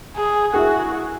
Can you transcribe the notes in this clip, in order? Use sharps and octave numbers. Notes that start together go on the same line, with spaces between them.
G#4
E4 F#4 G#4